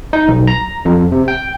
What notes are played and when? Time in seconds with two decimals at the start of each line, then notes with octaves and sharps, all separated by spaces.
0.13 D#4
0.28 B1
0.47 A#5
0.85 F2
1.12 C3
1.28 G5